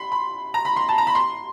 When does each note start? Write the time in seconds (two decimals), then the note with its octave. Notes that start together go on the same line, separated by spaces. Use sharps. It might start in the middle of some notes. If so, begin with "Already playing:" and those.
Already playing: B5 C6
0.12 B5
0.54 A#5
0.65 B5
0.76 C6
0.89 A5
0.98 A#5
1.07 B5
1.15 C6